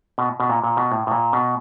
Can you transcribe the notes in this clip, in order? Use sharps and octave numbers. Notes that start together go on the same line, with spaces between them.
B2
B2
A#2
A#2
B2
A2
A2
A#2
B2